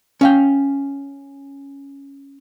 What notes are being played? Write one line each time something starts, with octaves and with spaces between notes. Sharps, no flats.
C#4 F5 G5